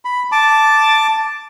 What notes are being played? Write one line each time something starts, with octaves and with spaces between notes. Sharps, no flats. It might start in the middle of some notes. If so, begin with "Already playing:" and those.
B5
A5 D6